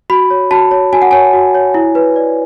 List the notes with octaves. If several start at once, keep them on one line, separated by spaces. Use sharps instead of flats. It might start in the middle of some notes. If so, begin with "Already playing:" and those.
F#4 B5
C#5
F#4 A5
C#5
F#4 G#5
F#5
C#5 G#5
F#4
C#5
E4
B4
D5